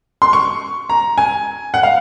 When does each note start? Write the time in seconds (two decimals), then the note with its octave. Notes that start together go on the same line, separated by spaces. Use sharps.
0.22 C6
0.33 C#6
0.90 A#5
1.18 G#5
1.74 F#5
1.83 F5